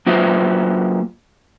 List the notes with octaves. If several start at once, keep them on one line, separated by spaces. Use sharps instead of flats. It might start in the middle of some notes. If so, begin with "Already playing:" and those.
F#3 A#3 F4 B4 C5 E5